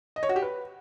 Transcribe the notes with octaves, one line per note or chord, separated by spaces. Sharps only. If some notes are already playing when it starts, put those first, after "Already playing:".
D#5
C#5
F#4
G4
B4